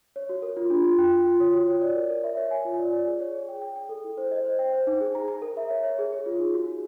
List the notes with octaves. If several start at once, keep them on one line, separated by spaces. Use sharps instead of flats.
C#5
F#4
A#4
F4
D4
F4
G5
G5
F4
C#5
F#4
C#5
D5
A#4
A#4
E5
C#5
G#5
F4
D5
D5
G#4
C#5
G#4
G5
G5
G5
A4
E4
C5
D#5
C5
G5
C5
D#4
G#4
A#5
A#5
A#4
E5
C#5
C#5
G#4
G#4
F4
D#4
F#4
F#4